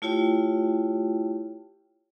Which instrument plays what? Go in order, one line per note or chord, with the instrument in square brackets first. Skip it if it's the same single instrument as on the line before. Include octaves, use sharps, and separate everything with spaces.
[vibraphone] A3 E4 F4 G4 C#5 G5